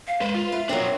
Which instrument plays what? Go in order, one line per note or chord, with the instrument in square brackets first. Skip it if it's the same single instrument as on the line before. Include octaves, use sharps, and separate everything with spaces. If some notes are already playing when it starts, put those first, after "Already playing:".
[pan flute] F5
[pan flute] G#3 [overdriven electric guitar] B4 C5
[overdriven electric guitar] F4
[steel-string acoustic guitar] B4 [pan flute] E5
[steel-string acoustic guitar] F#3 C4 [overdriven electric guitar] D4 A#4